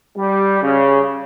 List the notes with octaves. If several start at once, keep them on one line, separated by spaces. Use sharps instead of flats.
G3
C#3